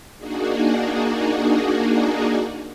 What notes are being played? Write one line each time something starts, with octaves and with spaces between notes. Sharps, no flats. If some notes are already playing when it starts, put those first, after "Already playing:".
A#3 D4 D#4 F#4 G#4